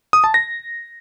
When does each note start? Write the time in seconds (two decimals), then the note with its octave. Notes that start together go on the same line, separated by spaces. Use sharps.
0.13 D#6
0.24 A5
0.34 A#6